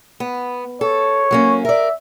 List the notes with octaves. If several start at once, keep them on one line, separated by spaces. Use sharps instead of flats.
B3
A4 C#5
F#3 A#3 C#4
A#4 D5 E5